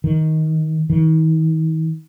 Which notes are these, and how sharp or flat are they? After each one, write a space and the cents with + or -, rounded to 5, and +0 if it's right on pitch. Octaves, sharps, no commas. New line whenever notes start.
D#3 +15
D#3 +45